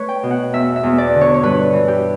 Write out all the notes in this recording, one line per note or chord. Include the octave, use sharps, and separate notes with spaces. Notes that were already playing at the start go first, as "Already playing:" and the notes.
Already playing: A3 B4 C#5
G5
B2
F#5
E2 E5
E5
E2
D5
D3
C#5
C#5
G2 B4
E3
G4